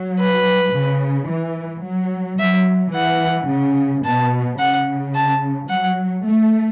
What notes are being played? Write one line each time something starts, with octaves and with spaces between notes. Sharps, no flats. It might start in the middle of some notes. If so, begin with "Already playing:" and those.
Already playing: F#3
B4
C#3
E3
F#3
F#3 E5
E3 F#5
C#3
B2 A5
C#3 F#5
A5
F#3 F#5
A3